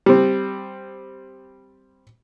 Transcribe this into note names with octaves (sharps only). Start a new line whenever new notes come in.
G3 C4